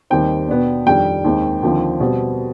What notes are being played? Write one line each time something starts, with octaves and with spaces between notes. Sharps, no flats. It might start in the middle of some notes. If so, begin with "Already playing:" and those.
D#2 D#3 G3 C4 G5
B2 B3 D4
F2 D#3 G3 D4 G5
D#2 D#3 G#3 C4
D#2 D3 F3 C4
B2 G3 C4